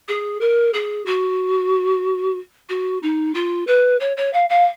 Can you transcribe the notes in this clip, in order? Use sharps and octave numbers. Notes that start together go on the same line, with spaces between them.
G#4
A#4
G#4
F#4
F#4
D#4
F4
B4
C#5
C#5
F5
F5